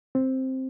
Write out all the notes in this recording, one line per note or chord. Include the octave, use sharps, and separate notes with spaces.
C4